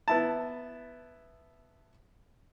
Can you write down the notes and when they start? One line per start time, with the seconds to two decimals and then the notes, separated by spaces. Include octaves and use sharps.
0.08 B3 E4 A5